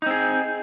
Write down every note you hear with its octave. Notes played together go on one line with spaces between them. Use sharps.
C4 D#4 G#4